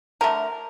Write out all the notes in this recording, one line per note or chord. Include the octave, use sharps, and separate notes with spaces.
D3 A3 A#4